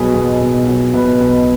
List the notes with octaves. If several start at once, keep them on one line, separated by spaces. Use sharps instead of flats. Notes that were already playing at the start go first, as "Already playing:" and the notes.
Already playing: B1 B2 F#3 F#4 G#4 B4
B1
B1
F#3
B2 B4
B1